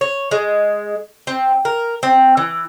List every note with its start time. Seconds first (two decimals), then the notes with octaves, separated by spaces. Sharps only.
0.01 C#5
0.31 G#3
1.27 C4
1.65 A#4
2.03 C4
2.37 E3